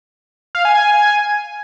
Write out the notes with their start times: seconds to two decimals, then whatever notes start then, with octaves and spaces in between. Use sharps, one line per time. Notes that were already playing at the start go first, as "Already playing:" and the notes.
0.55 F5
0.65 G#5
0.75 G#5